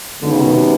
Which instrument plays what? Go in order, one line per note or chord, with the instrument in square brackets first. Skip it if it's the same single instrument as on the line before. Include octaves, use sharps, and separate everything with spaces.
[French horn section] F#2 D#3 G#3 B3 D#4 [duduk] D3
[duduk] C#3
B2
C3